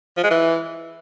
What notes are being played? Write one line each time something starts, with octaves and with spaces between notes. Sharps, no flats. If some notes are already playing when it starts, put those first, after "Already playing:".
F3
G#3
E3